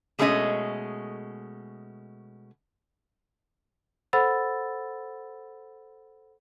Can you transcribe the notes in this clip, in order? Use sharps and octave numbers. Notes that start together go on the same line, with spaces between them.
B2 G#3 A3 C#4 D#4 D#5
A4 C5 F#5 B5 E6 A6